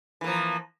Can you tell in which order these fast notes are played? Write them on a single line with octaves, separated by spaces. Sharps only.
E3 A#3 F3